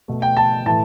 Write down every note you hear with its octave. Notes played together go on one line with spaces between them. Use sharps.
B2 A3
G5
A5
A2 E3 A3 A5